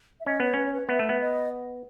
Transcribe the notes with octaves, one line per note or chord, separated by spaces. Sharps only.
E5
C#4 D#5
B3 C#5
C#4 B4
C#5
B4
B3 E5
A3
B3
D#5